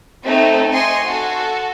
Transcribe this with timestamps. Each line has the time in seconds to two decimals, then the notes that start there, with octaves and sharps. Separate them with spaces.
0.24 A3 C4 D#4
0.72 D#5 G#5 C6 C#6
1.05 F#4 A4